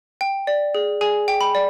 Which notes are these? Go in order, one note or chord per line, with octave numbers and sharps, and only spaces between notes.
G5
D5
G#4
G#4 G#5
G5
B5
D5